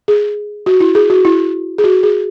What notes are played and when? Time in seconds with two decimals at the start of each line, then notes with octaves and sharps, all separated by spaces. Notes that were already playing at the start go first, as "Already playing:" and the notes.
0.08 G#4
0.66 F#4
0.80 E4
0.95 G#4
1.10 F#4
1.25 E4
1.78 G#4
1.84 F#4
2.03 G#4